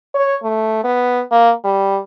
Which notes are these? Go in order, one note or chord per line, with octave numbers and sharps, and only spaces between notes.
C#5
A3
B3
A#3
G3